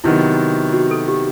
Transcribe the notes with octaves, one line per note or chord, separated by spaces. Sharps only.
C3 D#3 F#3 B3 E4 F#4
F#4
A4
G4